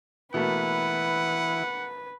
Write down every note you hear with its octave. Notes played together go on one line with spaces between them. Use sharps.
B2 E3 A3 A#3 E4 B4 F#5